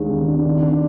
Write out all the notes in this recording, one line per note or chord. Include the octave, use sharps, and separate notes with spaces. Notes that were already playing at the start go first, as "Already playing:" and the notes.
Already playing: D#2 D#3 G#3 D4
D#3
D4
D#3
D4